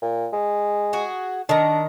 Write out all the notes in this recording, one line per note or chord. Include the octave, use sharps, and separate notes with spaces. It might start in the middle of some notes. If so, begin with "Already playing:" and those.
A#2
G#3
F#4 G#4
D#3 D4 A#5